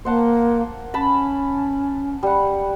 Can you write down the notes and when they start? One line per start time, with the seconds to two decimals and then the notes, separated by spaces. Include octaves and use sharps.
0.05 A#3 C5 F#5 A5
0.94 C#4 A5 B5
2.23 G3 F#5